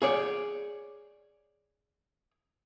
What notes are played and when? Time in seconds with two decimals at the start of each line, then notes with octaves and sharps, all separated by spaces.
0.02 G#4 C#5 D5